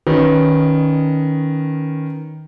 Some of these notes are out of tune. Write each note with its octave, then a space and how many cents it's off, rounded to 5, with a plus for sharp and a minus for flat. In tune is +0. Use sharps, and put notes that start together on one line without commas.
D#3 +0 C#4 +5 B4 +0